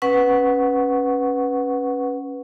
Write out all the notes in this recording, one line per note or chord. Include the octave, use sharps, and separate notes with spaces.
C#4 B4 F#5 C#6